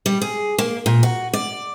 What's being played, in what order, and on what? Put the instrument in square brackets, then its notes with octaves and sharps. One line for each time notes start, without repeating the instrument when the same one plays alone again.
[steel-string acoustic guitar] G3
G#4
A#3
A#2
F#4
D5